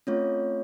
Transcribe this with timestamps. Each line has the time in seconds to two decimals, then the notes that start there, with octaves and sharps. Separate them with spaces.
0.07 A3 C4 C#4 F4 C#5